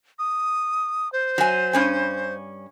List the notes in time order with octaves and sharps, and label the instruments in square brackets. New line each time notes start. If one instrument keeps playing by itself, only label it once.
[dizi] D#6
C5
[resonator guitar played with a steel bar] F#3 G#5
G2 C#4 G#5